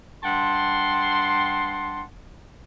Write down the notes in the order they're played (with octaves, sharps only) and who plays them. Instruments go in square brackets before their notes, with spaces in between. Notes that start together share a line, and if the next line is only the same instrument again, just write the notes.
[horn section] G2 F#5 G5 A5 C6